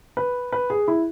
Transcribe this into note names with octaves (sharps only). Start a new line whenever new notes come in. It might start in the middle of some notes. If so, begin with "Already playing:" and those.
B4
B4
G#4
E4